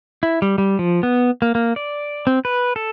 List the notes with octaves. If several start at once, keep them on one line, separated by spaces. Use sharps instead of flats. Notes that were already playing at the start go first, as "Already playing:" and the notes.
E4
G3
G3
F3
B3
A#3
A#3
D5
C4
B4
A4